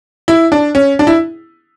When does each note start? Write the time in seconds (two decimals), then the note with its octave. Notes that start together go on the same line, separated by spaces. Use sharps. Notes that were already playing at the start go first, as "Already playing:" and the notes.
0.28 E4
0.52 D4
0.75 C#4
0.99 D4
1.07 E4